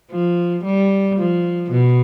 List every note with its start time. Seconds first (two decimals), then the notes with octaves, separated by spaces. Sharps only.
0.12 F3
0.65 G3
1.19 F3
1.71 B2